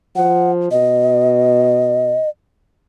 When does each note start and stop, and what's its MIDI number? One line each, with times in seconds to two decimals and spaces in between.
0.16 0.70 53
0.16 0.51 78
0.71 2.19 47
0.71 2.29 75